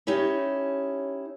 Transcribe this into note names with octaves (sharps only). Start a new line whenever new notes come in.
C#4 D#4 E4 G4 C#5